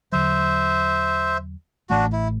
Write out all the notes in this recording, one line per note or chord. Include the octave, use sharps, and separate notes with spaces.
E2 D3 F#3 C5 E5
A1 A2 E3 A3 D4 F#4
E4